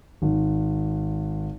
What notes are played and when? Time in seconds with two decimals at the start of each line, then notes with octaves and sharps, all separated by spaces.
0.22 G#1